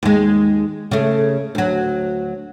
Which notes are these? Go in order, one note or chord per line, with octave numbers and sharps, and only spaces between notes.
D#2 G#3
C#3 A3
D2 F#3